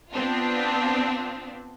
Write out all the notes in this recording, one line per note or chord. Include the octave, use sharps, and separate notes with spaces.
B3 C4 D4 F4